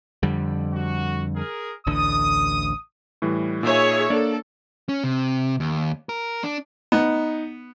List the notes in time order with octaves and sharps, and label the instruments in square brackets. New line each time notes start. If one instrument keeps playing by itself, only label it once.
[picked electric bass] F2 D3 G3
[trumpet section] F#4
G#4 A#4
[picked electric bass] A1 D2 D3 [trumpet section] D#6
[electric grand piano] A2 E3 G3
[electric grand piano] A#2 D#4 [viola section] G#4 C#5 E5
[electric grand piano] A#3 D4 D5 [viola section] A4
[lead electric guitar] C#4
C3
D#2
A#4
D4
[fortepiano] B3 [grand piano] D#4